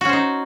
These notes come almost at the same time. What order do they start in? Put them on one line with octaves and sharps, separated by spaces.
F#4 C#4 C5 D#4